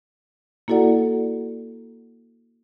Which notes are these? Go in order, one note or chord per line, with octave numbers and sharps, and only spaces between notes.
A#3 E4 F#4 A4 D5 F#5